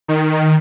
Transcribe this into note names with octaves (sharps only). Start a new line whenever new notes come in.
D#3